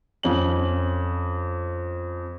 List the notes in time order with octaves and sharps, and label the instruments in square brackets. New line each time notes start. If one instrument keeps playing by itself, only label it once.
[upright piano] F2 C#4 F#7